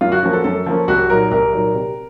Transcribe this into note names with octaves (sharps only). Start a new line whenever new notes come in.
F#2 F4
F#4
F3 A#3 C#4 F#4
A4
F#2 A4
F3 A#3 C#4
C2 F#4
A#2 F#3 A#3 D#4 A#4
C2 A#4
A#2 F#3 A#3 D#4
C3